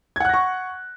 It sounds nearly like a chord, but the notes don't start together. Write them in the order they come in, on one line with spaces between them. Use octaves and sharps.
G#6 F#5 F#6 A#6 C#6